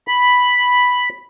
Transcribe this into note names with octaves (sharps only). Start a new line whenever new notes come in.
B5